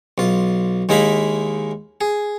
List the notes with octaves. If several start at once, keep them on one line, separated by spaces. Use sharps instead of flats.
B1 F4
D#2 G#3 D#4 E4 F5 B5
G#4